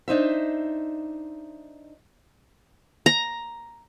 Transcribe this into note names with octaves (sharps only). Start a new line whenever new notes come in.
D4 D#4 C5 E5
A#5